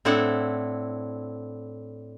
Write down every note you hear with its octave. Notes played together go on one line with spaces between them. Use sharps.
A2 C4 D4 E4 A4 F#5